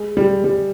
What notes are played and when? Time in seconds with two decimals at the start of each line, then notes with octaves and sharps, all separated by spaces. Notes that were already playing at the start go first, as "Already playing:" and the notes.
Already playing: G#3
0.17 G3
0.44 G3